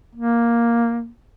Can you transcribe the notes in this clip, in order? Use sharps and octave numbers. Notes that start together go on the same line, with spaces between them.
A#3